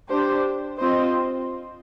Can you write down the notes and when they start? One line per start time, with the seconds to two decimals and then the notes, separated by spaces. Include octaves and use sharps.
0.11 D4 G4 C5
0.80 C4 F4 C5 D#5